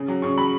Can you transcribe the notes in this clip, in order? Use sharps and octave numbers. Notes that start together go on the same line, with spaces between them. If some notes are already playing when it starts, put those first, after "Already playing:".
Already playing: C#3
F#3
C#3 C#6
F#3 B5